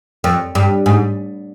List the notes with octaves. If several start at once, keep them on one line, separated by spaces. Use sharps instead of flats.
F2
G2
G#2